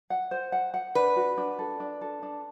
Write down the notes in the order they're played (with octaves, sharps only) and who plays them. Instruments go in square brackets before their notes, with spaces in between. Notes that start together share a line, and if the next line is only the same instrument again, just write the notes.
[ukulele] F#5
C5
F#5
F#5
[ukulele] D4 [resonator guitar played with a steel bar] B4
[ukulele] F#4
D4
A4
D4
A4
D4